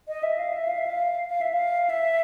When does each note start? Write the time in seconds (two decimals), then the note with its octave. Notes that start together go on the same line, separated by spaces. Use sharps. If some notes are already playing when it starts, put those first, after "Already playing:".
0.08 D#5
0.23 E5
0.38 F5
0.53 E5
0.68 F5
0.78 E5
0.87 F5
1.29 F5
1.41 E5
1.53 F5
1.90 E5